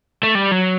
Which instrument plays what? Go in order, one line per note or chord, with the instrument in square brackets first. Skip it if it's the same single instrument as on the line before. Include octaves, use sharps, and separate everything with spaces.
[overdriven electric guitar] A3
G3
F#3